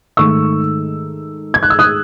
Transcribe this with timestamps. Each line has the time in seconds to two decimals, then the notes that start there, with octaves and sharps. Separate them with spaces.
0.17 G#2 D#3 A3 D#4 C#6 E6
1.54 G#6
1.63 F#6
1.70 E6
1.79 D#6 F#6